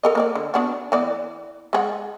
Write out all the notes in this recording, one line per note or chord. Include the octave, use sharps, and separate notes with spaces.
A4 A#4 D#5
A#3 A#4 D5
D3
B3 D4 F#4
E3 B3 D5
G#3 G#4 F#5